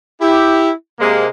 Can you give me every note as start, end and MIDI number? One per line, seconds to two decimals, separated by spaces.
0.21 0.71 64
0.21 0.71 67
1.00 1.27 48
1.00 1.27 56
1.00 1.27 58